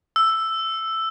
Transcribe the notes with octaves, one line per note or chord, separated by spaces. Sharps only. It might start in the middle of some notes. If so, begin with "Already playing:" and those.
E6